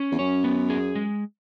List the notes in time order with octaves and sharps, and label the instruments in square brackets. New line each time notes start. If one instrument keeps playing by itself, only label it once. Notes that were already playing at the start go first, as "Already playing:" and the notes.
Already playing: [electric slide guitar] C#4
[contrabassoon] E2
[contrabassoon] F#2 [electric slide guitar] C#5
[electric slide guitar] B3
G#4
G#3